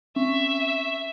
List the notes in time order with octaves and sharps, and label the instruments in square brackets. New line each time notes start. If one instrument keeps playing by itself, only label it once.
[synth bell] C4 C#4 C#6 [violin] E5